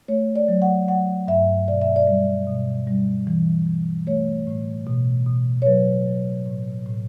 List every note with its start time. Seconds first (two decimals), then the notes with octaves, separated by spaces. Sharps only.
0.08 A3 C#5
0.36 D5
0.48 F#3
0.62 F#5
0.88 F#3 F#5
1.28 G2 E5
1.68 B2 D5
1.81 E5
1.96 D5
2.07 G3
2.47 B2
2.87 G3
3.27 E3
3.67 E3
4.07 A3 C#5
4.47 A2
4.87 B2
5.26 B2
5.62 C#5
5.66 F#3 B4
6.06 F#3
6.46 A2
6.86 A2